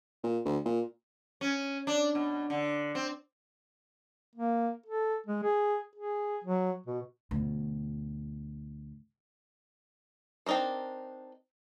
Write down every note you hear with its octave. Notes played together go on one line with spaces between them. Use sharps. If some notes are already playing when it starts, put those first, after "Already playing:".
A#2
D2
A#2
C#4
D4
B2
D3
C4
A#3
A4
G#3
G#4
G#4
F#3
B2
D2 B2
C4 D4 D#4 A#4 C5